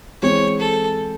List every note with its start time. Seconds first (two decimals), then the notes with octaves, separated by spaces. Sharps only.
0.22 E3 G#3 C4 C#5
0.59 A4